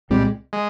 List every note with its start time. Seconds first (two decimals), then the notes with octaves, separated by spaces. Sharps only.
0.10 C2 A#2 G3 G#3 C4
0.53 G#3